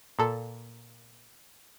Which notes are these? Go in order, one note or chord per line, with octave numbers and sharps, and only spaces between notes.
A#2 A4